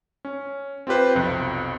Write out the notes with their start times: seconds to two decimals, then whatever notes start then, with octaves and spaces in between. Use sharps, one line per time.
0.25 C#4
0.87 C4 F4 G4 B4 C5
1.15 B1 F2 C3